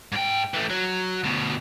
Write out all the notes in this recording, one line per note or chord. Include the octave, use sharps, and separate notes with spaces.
G#2 G5
E3 A3
F#3
D2 B2